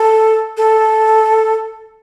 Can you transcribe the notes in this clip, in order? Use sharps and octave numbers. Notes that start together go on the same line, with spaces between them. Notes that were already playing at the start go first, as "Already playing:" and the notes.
Already playing: A4
A4